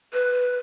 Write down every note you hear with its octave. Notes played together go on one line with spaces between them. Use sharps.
B4